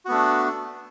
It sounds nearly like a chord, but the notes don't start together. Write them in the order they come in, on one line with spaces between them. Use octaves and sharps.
F#4 B3 A3 D4